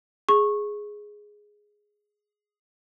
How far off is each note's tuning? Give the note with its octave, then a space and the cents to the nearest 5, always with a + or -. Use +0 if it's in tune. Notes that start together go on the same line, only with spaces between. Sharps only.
G#4 +0 C#6 -15